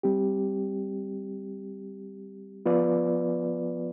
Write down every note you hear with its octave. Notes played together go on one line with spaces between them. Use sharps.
G3 C4 G4
F3 B3 F4 B4 D5